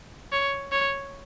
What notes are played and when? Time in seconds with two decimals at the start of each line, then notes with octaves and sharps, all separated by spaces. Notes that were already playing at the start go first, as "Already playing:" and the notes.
0.32 C#5
0.72 C#5